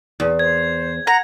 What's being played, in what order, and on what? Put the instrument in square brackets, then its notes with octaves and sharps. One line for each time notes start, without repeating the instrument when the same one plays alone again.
[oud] E2
[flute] C5 [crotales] G#6
[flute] F#5 [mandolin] A#5